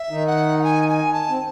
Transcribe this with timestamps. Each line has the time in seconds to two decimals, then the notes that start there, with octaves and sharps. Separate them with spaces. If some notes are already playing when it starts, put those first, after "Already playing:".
Already playing: E5
0.10 D#3 D#4
0.27 F#5
0.59 F#5
0.64 G#5
0.89 G#5
1.13 A5
1.29 C4